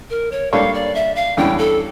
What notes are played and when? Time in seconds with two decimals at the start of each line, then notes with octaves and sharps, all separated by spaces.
0.10 A#4
0.32 C#5
0.52 G3 A#3 D4 A4 C#5 F5
0.74 D5
0.95 E5
1.16 F5
1.37 E2 D3 G3 C#4 G5
1.58 A4